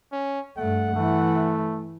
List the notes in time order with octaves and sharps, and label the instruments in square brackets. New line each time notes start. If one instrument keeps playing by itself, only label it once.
[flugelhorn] C#4
[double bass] G2 A3 [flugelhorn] F#5
[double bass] E3 [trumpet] A3